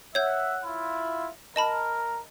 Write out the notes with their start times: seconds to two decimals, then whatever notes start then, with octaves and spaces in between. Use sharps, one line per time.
0.15 C#5 E5 F#5 G6
0.65 E4 F4
1.56 A#4 D#5 A5 B5